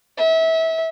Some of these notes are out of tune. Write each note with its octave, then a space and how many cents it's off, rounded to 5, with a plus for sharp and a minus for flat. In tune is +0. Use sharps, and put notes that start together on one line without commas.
E5 -25